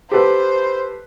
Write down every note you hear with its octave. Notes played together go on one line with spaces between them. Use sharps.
G4 A4 B4 C5